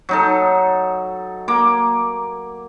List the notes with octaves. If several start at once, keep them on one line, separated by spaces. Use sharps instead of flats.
F#3 D#4 A4
A#3 D6